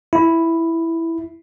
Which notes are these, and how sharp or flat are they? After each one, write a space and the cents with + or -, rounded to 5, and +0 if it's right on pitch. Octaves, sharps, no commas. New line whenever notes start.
E4 +0